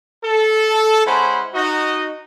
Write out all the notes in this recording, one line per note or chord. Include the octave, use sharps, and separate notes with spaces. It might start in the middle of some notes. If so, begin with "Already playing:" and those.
A4
G#3 C#4 E4 C5 F#5 B5
D#4 F#4 D#5